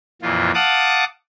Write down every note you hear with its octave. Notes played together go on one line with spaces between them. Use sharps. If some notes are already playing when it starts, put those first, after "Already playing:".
F2 A#2 E3 F4
F5 F#5 A5 D6 D#6 F#6